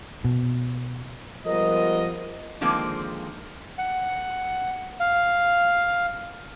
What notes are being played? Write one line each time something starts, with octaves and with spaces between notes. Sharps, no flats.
B2
F3 G3 G#3 B3 A#4 D#5
D3 D#3 F3 G#3 A#3 C4
F#5
F5